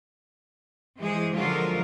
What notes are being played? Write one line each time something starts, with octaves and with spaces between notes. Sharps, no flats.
E3 G#3 G#4 C5
D3 F3 F#3 G#3 F4 A#4